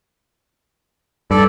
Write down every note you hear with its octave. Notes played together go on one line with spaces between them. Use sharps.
G2 A4 D5